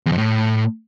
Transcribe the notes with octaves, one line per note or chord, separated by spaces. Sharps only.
E2
F2
A2